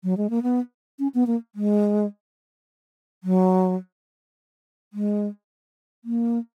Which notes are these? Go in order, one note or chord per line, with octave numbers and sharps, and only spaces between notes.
F#3
G#3
A#3
B3
C#4
B3
A#3
G#3
F#3
G#3
A#3